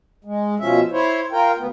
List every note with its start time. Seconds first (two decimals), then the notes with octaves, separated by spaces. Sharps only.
0.24 G#3
0.59 B2 F3 C#4 E5
0.92 E4 C5 C#5
1.32 F4 A#4 G5
1.57 D2 B3